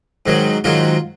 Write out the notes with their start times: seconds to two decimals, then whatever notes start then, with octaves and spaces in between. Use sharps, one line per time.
0.26 G#2 D#3 F#3
0.64 G#2 D#3 F#3 F4